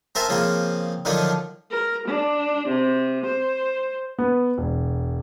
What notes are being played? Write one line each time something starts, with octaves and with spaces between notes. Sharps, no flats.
C4 A#4 C5 E5 G#5 A5
C#3 F3 A#3 C4
D3 D#3 F3 F#3 D4
A#4
D4
C3
C5
B3
E1